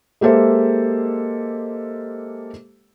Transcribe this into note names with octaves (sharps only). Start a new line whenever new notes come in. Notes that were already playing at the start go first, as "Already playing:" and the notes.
G#3 A#3 G4 A4 C5 E5